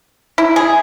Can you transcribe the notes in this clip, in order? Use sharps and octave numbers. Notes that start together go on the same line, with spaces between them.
E4
G#4